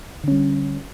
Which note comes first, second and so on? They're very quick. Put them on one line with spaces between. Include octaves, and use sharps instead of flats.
D3 C#4 G3